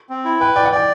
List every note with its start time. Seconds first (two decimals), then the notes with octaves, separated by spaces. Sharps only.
0.09 C4
0.25 E4
0.40 B4 G5
0.55 D5 G5
0.65 F#5
0.72 D5 G5